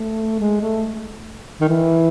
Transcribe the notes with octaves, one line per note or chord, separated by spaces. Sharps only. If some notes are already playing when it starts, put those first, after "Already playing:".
Already playing: A3
G#3
A3
D#3
E3